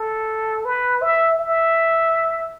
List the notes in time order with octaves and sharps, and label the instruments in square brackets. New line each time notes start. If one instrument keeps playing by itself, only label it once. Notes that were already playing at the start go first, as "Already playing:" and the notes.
Already playing: [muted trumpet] A4
B4
E5
E5